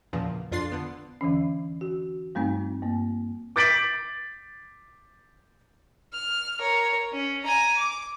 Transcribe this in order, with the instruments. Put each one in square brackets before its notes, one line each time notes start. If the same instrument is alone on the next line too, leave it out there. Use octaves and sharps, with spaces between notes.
[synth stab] E2 A#2 C#3 F3
F2 D4 F4 C6 A6 C7
D3 B3
[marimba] E2 D3 E3 C#4
F#4
G2 G3 A3 C4 D#4
G2 A#3
[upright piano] D6 G6 A6 B6 D7 F#7
[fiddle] F6
A#4 C#5
C#4
G#5 A#5
D6